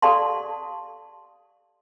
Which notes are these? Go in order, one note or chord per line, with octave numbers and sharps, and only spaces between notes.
G4 A4 D5 F5 A5 C6